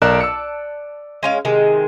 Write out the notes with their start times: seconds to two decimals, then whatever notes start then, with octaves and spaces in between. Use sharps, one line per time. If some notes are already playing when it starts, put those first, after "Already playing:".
0.02 B1 A#4 D5 A5 F#6
0.21 E6 C#7
1.23 G#3 C#4 F5
1.45 C3 D#3 G#3